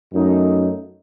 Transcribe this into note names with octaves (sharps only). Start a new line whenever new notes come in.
F#2 A3 D#4